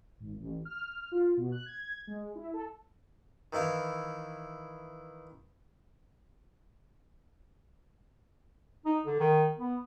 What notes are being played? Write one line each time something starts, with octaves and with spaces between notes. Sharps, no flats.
G#1
A1
F6
F4
B2
F#6
G#6
G#3
E4
A4
D#3 E3 E4 F5
D#4
D3
D#3
B3